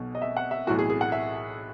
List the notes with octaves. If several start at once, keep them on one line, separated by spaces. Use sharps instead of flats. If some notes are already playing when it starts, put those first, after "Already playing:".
Already playing: B1 B2
D#5
E5
F#5
E5
B1 A2 E3 F#4
G#4
G#4
F#5
E5